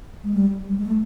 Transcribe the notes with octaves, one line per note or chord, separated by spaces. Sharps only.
G#3
G3
G3
G#3
A3